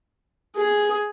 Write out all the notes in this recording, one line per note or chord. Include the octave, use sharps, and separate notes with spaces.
G#4